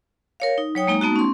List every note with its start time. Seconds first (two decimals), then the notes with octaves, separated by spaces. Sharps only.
0.40 A#4 C#5 F5
0.58 D#4
0.75 F#3 C#5 G5 D#6
0.87 G#3 A#3 D#4 A#5
1.01 A3 B3 D#4 F#4
1.16 C#4 C6